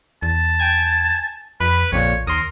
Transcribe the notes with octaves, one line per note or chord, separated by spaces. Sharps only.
E2 A5
G5 G#5 G#6
F2 B4 B5
A#1 F2 A#2 C#5
D#2 A#4 C6 D#6